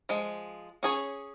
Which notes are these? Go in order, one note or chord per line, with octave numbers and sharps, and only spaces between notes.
F3 G#3
C#4 G#4 C#5